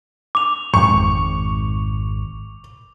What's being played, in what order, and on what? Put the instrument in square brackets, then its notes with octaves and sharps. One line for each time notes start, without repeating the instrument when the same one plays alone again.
[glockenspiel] D6 F7
[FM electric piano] F2 G#2 [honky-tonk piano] C#6
[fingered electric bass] G#1